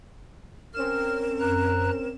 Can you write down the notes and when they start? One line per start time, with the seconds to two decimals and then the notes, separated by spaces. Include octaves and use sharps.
0.74 C4 C#4 A#4 F6 E7
1.40 F#2 A#5 F#6